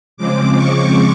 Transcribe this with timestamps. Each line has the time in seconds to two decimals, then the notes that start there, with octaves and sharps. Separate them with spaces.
0.17 C#3 F3 G#3 C4 D6
0.56 C#6